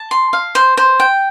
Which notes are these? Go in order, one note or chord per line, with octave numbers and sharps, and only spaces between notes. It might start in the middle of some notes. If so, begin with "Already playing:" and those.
Already playing: A5
C6
F5
C5
C5
G5